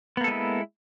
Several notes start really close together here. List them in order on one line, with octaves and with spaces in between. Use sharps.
B3 A#3 A4 G#3 E4